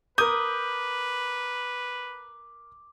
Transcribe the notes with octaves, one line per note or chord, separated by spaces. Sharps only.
A#4 B4 D6 D#6 G6